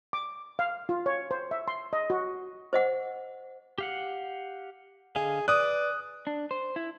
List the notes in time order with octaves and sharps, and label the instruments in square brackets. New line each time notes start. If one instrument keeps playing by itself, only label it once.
[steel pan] D6
F5
F4
C#5
C5
E5
C6
D#5
F#4
[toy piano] C5 D#5 F#5
[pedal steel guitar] G4 F5 F#5
[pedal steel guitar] D3 D#5 F5 [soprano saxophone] G#4
[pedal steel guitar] B4 [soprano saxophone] D5 [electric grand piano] D#6 F#6
[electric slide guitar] D4
C5
E4